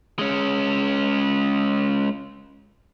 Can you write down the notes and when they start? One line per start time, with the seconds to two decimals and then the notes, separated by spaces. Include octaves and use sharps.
0.19 G#3 C#4